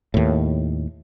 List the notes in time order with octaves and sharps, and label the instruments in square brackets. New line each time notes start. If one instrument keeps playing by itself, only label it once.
[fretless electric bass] D#2 A2